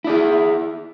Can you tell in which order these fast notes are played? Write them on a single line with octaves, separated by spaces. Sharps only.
E4 D5 G#4